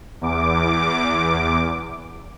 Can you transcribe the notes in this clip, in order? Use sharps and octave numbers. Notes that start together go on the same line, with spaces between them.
E2 D6